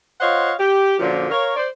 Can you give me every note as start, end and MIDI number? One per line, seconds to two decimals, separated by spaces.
0.21 0.52 65
0.21 0.52 72
0.21 0.52 73
0.21 0.52 75
0.21 0.52 77
0.21 0.52 78
0.60 0.94 67
0.99 1.29 42
0.99 1.29 46
0.99 1.29 50
0.99 1.29 53
1.30 1.56 70
1.30 1.56 73
1.30 1.56 77
1.56 1.67 72
1.56 1.67 74